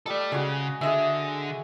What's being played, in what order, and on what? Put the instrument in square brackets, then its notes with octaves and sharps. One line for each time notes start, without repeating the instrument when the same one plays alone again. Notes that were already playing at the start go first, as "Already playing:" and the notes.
[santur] G3 D#5 [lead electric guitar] A3 A4
[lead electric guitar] C#3 [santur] G#3 F#4
[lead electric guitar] D3 [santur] G#4 D#5 E5